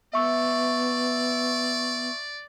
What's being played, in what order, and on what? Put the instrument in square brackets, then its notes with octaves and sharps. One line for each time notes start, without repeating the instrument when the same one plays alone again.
[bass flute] B3 [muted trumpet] D5 [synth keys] E5 C#6 E6